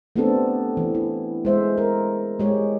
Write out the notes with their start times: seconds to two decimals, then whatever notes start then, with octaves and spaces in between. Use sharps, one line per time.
0.16 A3 B3 C4 D4 G4 A4
0.77 E3
0.95 E4
1.45 G#3 C5 E5
1.78 A#4
2.39 G#3 G4 C#5